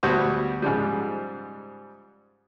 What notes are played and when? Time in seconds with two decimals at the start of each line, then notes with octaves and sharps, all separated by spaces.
0.03 D2 G3 B3 F#4 C5 C#6
0.62 G#2 C#3 F3 G3